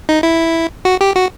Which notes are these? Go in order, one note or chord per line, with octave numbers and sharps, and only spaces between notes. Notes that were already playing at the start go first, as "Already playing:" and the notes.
D#4
E4
F#4
G4
F#4